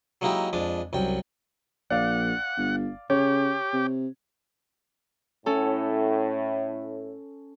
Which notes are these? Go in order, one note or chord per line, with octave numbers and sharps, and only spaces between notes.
F#3 G#3 A#3 D#4 E4 G4
F2 G#3 D4 D6
C2 F#2 G5
A#1 D5 F5 F#5
G1
C#3 G4 C#5
C3
A2 C#4 A4